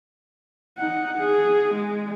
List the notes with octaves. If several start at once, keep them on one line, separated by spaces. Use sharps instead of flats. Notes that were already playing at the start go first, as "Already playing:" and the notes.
D#4 F#5
G#4
G#3